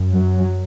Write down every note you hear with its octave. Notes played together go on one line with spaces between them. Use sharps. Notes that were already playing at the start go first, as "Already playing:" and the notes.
Already playing: F#2
F#3